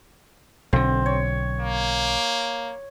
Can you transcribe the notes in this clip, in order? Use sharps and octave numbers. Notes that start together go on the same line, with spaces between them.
B1 D3 C4
C#5
A#3